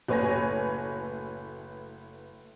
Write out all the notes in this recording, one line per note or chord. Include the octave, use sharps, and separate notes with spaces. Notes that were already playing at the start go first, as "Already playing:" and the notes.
F#1 A2 B4 C#5 G#5 A#6